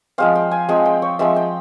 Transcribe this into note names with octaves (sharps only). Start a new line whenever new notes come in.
F3 G#3 C4 F5
G5
G#5
F3 G#3 C4 G5
G5
C#5
F3 G#3 C4 E5
G5